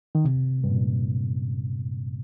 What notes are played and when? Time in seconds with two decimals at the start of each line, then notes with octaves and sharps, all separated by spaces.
0.15 D#3
0.25 C3
0.64 G2
0.70 A#2